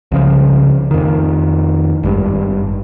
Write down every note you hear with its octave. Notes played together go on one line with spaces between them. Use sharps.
C2 C#3 F3
F2 D#3
G#1 G2